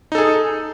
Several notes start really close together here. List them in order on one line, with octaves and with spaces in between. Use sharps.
D#4 A4 G#4